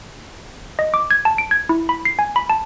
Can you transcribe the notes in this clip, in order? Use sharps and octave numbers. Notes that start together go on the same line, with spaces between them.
D#5
D6
G#6
A5
D7
G#6
E4
B5
C7
G#5
B5
A5